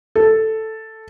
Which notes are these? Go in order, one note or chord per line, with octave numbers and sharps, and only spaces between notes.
A4